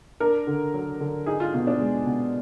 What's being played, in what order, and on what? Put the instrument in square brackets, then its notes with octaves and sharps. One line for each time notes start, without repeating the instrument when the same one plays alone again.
[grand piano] D4 [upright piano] A#4
[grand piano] D3
F#3
D3
[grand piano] D#4 [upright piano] G#4
[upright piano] F4
[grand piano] B2 [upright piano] F4
[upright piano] D4
[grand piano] G#3
B2